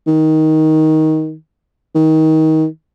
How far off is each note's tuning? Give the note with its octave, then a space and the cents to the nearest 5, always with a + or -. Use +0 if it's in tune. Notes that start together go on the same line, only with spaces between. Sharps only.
D#3 +15
D#3 +25